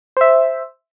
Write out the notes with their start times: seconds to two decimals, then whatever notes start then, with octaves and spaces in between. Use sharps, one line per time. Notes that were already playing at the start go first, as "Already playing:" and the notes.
0.17 C5 E5